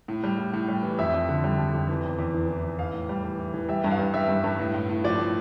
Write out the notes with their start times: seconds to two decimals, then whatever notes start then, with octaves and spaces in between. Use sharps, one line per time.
0.08 A2
0.24 G3
0.38 A2
0.54 A2
0.68 G3
0.83 E3
0.99 F2 E5
1.14 F2
1.29 D3
1.44 G3
1.59 F2
1.74 F2
1.89 E3
2.04 E2
2.19 E2
2.34 E3
2.48 E3
2.64 E2
2.79 E3 F5
2.94 A2
3.09 G3
3.24 E3
3.39 E3
3.54 E3
3.69 G3 E5
3.84 G2
3.91 F5
3.99 G2
4.14 G3 E5
4.29 G2
4.44 G2
4.59 A2
4.74 A2
4.89 A2
5.04 F3 D5
5.19 A2